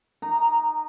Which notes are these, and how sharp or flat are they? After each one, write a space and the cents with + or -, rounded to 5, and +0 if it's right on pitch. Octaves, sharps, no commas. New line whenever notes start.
D#4 -20 A#5 +0